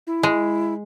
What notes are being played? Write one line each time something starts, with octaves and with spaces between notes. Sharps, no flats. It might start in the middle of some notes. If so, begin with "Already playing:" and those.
E4
G#3